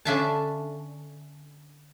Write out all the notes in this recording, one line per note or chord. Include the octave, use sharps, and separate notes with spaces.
D3 C#4 D4 E5 F5 A5